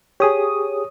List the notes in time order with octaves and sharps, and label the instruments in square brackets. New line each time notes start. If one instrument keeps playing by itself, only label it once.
[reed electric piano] G4 G#4 [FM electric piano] C#5 D#6